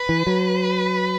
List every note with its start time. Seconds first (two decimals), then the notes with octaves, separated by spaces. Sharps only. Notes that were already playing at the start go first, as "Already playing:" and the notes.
Already playing: B4
0.09 E3
0.27 F#3